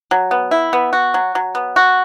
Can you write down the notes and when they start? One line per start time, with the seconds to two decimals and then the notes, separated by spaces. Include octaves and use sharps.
0.11 F#3
0.31 B3
0.51 E4
0.73 B3
0.93 F#4
1.14 F#3
1.35 F#3
1.55 B3
1.76 F#4